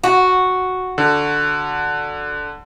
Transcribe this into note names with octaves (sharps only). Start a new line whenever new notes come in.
F#4
D3